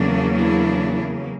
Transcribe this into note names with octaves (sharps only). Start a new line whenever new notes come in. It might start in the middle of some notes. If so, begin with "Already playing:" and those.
Already playing: E2 C#3 F#3 A#3 D4
D4 E4